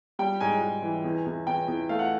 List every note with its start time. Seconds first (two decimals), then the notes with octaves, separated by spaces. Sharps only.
0.19 G3 G5
0.40 G#2 G#5
0.61 G#2
0.82 E3
1.04 E2
1.26 E2
1.47 E2 G5
1.68 E2
1.89 A3 F5
1.99 F#5